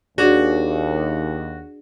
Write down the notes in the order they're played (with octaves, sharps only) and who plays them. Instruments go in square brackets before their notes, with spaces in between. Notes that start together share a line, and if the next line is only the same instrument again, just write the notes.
[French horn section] D#2 [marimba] D4 G#4 D5 [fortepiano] F#4